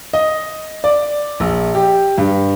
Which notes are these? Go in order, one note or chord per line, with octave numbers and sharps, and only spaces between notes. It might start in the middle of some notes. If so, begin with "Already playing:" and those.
D#5
D5
A#1
G4
G2